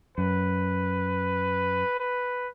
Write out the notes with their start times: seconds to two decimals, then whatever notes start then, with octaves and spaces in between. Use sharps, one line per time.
0.17 F#2 B4
2.00 B4